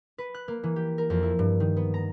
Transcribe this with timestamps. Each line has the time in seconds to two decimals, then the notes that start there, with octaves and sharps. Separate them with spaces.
0.18 B4
0.34 F#6
0.48 A#3
0.64 E3
0.76 G4
0.98 A#4
1.10 F2
1.23 E4
1.39 G2
1.60 D#3
1.77 B3
1.94 A#5